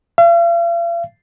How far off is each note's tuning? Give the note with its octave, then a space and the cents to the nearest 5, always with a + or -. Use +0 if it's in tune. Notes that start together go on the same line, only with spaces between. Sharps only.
F5 -45